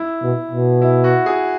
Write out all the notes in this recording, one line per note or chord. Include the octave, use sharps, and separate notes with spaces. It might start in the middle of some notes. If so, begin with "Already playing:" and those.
Already playing: E4
B2
B2
E4
F#4
G#4